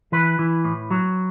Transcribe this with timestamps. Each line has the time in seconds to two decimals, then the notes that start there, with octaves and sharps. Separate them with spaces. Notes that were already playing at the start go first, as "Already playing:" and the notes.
0.12 E3 B4
0.39 E3
0.65 A2
0.91 F#3